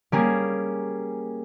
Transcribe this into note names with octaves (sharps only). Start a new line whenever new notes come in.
G3 A#3 C#4 G#4